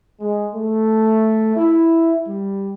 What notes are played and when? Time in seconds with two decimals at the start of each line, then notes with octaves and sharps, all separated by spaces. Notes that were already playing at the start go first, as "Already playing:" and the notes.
0.20 G#3
0.54 A3
1.56 E4
2.26 G3